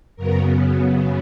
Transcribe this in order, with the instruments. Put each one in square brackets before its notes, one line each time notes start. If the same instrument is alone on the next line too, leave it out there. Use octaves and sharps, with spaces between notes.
[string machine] F#2 C#3 F#3 B3 A#4